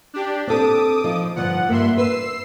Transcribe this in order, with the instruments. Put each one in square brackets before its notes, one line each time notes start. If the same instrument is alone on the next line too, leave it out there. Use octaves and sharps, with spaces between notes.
[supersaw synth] D4 G4
[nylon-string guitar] C4 A4 [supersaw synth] D6 D#6
[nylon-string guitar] F3 D#4 F4
[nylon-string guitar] G2 D3 F3 [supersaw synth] F#5
[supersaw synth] G2 E5 C6 [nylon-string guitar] A#3
[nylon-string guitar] B4 [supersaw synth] E6 C7